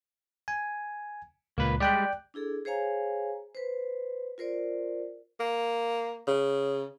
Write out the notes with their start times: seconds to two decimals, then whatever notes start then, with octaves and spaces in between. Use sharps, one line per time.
0.48 G#5
1.58 C#2 A#2 A#3 B4
1.80 G3 G#3 G4 D5 G5 F#6
2.34 D4 E4 G#4 A4
2.65 G#4 C5 C#5 F5 G#5 A#5
3.55 B4 C5
4.38 F4 A#4 C5 D5
5.40 A#3
6.27 C#3